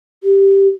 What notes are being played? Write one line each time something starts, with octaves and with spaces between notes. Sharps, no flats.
G4